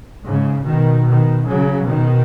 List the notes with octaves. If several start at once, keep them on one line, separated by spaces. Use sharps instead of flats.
G#2 C#3
B2 D#3
B2 D#3
C#3 F#3
B2 D#3